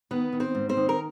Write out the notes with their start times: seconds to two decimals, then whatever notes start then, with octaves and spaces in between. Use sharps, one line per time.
0.11 D#3 B3 B4
0.33 D#3
0.40 C4 C5
0.55 G#2
0.69 C4 C5
0.77 D#3
0.89 A#4